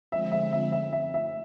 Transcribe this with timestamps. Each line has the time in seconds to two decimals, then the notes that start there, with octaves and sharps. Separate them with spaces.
0.12 D3 F3 G#3 C4 E5
0.32 E5
0.52 E5
0.72 E5
0.93 E5
1.14 E5